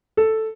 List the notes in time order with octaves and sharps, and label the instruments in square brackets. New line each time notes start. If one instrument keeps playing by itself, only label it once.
[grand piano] A4